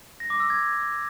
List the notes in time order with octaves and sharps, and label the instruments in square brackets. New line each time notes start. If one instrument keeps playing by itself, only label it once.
[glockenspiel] A#6
D6
E6
G#6